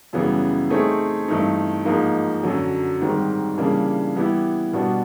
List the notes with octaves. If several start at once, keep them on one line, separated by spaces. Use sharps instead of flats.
F#2 C#3 E3 G3 B3
A3 C4 D#4 G#4 C#5
G2 E3 A3 C4 D#4
G#2 F3 A#3 D#4
F#2 D3 F#3
G#2 D#3 G3 C4
C#3 E3 G3 A#3 D4
E3 G3 B3 E4 G4
B2 G3 B3 D4 F#4